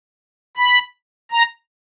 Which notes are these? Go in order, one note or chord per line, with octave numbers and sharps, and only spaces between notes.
B5
A#5